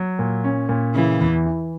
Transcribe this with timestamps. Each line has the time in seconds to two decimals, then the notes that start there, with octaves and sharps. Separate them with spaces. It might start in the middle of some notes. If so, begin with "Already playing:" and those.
Already playing: F#3
0.19 A#2
0.44 C#4
0.69 A#2
0.95 C#3 E3
1.20 E2
1.46 E3